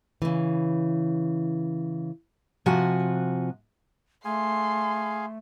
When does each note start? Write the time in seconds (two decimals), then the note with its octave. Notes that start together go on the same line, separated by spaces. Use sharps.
0.22 C#3 E3
2.66 C3 F3 F#4 G#5
4.25 A3 G#4 F5 G#5 C6